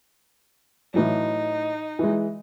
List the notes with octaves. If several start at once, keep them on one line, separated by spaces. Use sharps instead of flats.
A2 E3 F#3 D#4
E3 G#3